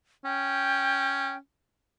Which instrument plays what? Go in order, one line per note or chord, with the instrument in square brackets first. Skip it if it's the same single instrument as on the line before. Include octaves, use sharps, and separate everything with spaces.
[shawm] C#4 [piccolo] G5